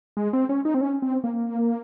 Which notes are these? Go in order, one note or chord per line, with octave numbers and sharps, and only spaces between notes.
G#3
C4
C#4
D#4
C4
C#4
C4
A#3